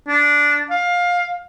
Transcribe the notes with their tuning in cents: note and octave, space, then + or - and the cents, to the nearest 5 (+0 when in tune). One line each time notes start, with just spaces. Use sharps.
D4 -10
F5 +20